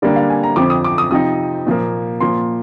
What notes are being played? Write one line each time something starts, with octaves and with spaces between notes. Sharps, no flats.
D3 G3 A#3 D4 D5
F5
G#5
A#5
F2 D3 F3 C4 D6
D#6
D6
D#6
C3 F3 C4 D#4 D#6
A#2 F3 A#3
A#2 F3 A#3 C6